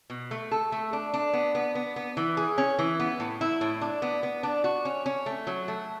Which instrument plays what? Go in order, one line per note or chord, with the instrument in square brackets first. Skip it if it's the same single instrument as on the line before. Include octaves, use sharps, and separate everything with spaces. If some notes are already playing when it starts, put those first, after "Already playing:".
[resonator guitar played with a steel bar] B2
A3
A4
A3
D4
D4
B3
B3
B3
B3
E3
G#4
C#4
E3
B3
A2
E4
A2
D4
B3
B3
D4
F#4
C#4
C#4
A3
F#3
A3